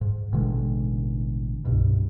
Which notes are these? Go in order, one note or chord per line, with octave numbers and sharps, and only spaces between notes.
G#2
A1 B2 D3 G#3
C2 G2 B2